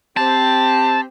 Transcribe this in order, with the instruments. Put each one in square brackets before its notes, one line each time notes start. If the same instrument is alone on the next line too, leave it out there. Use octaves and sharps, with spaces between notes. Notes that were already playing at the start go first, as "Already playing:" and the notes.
[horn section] C4 G4 [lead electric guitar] A5